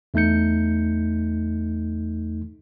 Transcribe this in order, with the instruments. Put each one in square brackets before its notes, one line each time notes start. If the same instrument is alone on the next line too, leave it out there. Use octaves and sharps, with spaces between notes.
[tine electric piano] E2 A3 D#4 G6 C#7